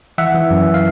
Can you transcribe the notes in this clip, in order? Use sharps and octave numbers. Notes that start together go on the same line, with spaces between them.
E3 E5 F#5
E3
F#2
F5